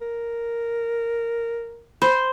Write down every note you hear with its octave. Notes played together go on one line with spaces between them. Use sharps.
A#4
C5 B5